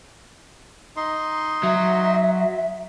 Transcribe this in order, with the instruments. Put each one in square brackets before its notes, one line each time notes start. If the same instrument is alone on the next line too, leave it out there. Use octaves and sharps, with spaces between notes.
[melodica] D#4 D#5 C6
[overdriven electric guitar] F#3 [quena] E5